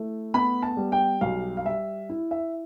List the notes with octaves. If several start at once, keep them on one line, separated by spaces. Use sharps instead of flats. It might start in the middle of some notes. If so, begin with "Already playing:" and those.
Already playing: A3 E4
B3 B5
A5
G3
G5
B1 F5
F5
G3 E5
E4
E5